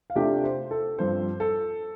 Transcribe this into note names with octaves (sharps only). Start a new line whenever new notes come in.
F5
C3 A3 D4 F4 G4 G5
C5
A4
G2 F3 C4 C5
A4